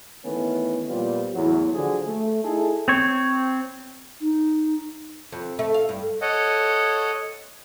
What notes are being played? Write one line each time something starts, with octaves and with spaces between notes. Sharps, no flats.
D#3 E3 A3 B3 C#4
A#2 F3 G3 B3 F4
E2 A2 F#3
D3 F3 F#3 G#4
A3
D#4 E4 G#4 A4
C4 C#5
D#4
F2
A3
F5
G2
A4 C#5 D#5 F#5